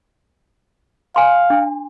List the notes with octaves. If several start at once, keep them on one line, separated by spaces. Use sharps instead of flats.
F5 G#5 C6
D4